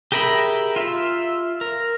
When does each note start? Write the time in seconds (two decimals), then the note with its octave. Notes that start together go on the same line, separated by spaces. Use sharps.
0.12 G4 G#4 A#4 E5 B5
0.76 F4 E5
1.61 A#4